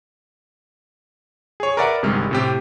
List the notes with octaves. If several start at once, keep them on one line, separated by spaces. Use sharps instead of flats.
G#4 C#5
A#4 B4 D5 E5 F#5
G1 C3 D#3 G3 G#3 F6
A2 C3 G4